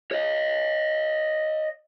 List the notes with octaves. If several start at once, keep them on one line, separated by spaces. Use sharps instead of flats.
C#5 D#5